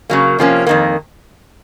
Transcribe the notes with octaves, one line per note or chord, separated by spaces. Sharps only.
C#3 F#3 A#3
C3 F3 A#3 C#4
F2 D#3 A#3